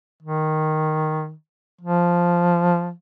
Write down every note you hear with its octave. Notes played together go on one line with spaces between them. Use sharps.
D#3
F3